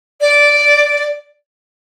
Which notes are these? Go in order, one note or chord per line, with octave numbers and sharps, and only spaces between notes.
D5